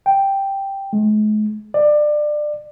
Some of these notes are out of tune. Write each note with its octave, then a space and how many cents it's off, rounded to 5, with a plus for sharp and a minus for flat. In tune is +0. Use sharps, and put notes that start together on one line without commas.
G5 +0
G#3 +45
D5 +25